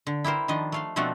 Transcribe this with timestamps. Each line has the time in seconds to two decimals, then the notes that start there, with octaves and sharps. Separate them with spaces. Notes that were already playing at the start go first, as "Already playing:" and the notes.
0.06 D3
0.24 E4 G4 A#4 C5
0.48 D#3 F3 D4 D#5
0.72 A3 F5 C6
0.96 B2 F3 A3 C4 D4 F#4